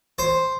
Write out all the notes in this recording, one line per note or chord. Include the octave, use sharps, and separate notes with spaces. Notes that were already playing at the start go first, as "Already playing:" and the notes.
C5